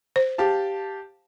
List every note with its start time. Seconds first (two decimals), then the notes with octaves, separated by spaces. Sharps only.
0.16 C5
0.38 G4 F5 A5